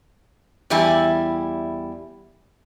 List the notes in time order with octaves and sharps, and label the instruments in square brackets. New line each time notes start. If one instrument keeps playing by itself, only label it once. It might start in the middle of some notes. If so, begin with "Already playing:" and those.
[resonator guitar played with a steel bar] E2 G3 E4 G#5